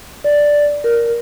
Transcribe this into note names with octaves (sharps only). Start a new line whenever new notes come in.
D5
A#4